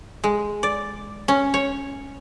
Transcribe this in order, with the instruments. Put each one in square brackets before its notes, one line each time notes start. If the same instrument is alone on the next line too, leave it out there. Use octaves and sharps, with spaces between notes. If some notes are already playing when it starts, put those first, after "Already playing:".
[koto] G#3
D5
C#4
C#5